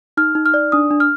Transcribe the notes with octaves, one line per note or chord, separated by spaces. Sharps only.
D#4 F6
D#4
F6
D5
D4 D#6
D4
F6